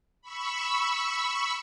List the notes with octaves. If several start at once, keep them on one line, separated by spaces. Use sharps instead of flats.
B5 C#6 E6